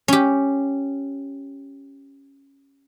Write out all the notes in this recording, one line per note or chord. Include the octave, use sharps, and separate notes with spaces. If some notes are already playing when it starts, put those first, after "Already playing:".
C#4 G4